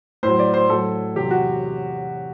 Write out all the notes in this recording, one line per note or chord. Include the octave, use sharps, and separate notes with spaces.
A2 F#3 C5
D5
C5
A2 F#3 A4
E2 C3 F#3 G4
F#4